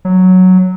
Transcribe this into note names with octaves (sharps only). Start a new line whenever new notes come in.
F#3